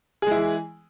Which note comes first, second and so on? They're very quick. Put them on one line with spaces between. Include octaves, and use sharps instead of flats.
G#4 G#3 E4 E3